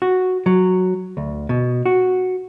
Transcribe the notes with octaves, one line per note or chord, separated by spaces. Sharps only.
F#4
F#3
D2
B2
F#4